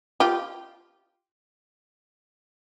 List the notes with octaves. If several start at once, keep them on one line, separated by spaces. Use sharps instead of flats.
F4 G4